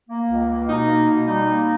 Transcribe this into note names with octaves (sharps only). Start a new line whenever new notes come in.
A#3
C#2
A#3
B2 D#4
A#3
B2
G3 D#4
A#3